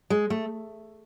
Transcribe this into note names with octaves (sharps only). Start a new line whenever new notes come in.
G#3
A3